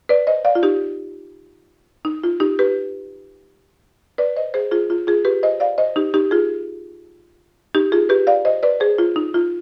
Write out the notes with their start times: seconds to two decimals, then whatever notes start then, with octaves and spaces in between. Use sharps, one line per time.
0.09 B4 D5
0.27 C5 D#5
0.45 D5 F5
0.55 F4
0.63 D#4 G4
2.05 D#4
2.23 F4
2.40 D#4 G4
2.59 G4 B4
4.18 B4 D5
4.37 C5 D#5
4.54 G#4 C5
4.71 F4 G#4
4.90 F4
5.07 F4 G#4
5.25 G4 B4
5.43 C5 D#5
5.60 D5 F5
5.78 C5 D#5
5.96 D#4 G4
6.14 D#4 G4
6.31 F4 G#4
7.75 D#4 G4
7.92 F4 G#4
8.09 G4 B4
8.27 D5 F5
8.45 C5 D#5
8.63 B4 D5
8.80 G#4 C5
8.98 F4
9.16 D#4
9.34 F4